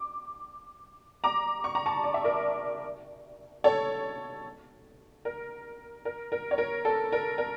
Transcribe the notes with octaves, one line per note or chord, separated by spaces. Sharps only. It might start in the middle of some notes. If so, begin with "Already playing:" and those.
Already playing: D6
A#5 D6
C#6
A#5
A5 C#6
D5
E5
A#4 D5
A4 C#5
A#4
A#4
A#4
C#5
A#4
A4
A#4
A#4